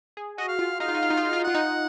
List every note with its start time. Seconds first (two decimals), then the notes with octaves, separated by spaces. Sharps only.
0.17 G#4
0.38 F#4 D#5
0.48 F5
0.59 F4
0.80 D#4 F5
0.88 F4
0.95 D#4
1.03 F4
1.10 D#4
1.17 F4
1.25 D#4
1.33 F4
1.39 D#4
1.44 F4 F#5
1.54 D#4